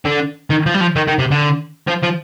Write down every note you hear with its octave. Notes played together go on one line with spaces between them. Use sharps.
D3
D#3
F3
G3
F3
D#3
D#3
C3
D3
F3
F3